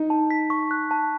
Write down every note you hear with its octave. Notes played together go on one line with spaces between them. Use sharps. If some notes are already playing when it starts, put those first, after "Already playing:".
Already playing: D#4
A5
B6
C#6
F#6
A5